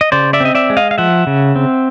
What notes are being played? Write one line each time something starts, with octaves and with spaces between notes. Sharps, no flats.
D#5
C#3 C5 D5
D5 E5
C4 D#5
D5 E5
G#3
D#5 F5
F5
F3 E5 F#5
C#3
C4